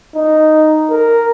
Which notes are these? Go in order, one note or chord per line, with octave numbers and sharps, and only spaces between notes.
D#4
A#4